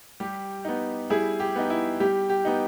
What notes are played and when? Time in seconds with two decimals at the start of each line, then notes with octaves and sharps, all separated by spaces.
0.20 G3 G4
0.65 B3 D#4
1.10 G3 E4 G#4
1.40 G4
1.56 B3 D#4
1.70 E4
2.00 G3 G4
2.30 G4
2.45 B3 D#4